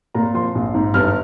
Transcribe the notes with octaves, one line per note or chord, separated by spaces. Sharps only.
A#2 A#5
F3 C6
A#1
G#2
G1 F6